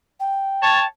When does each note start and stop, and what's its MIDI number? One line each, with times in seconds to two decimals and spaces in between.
0.20 0.85 79
0.62 0.84 73
0.62 0.84 81